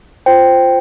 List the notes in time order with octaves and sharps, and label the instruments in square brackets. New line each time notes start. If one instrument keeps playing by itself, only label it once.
[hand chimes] F4 C5 G5